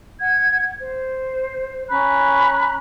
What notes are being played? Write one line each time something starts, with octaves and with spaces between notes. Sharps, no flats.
F#5 G#6
C5
C#4 A#5 B5 F#6